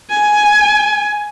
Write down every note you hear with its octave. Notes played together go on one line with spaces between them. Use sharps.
G#5